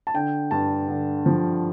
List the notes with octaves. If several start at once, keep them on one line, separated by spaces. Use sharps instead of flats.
A5
D3 G5
G2 A5
D3
F3